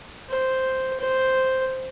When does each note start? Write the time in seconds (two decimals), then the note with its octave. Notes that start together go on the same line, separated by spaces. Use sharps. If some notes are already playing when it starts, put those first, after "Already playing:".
0.29 C5
1.00 C5